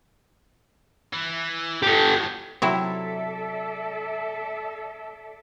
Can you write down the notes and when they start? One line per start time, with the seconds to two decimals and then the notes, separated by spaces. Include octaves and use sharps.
1.13 E3
1.83 A2 G#3 G4 A4
2.62 C3 F#3 E4 A4 D5 E5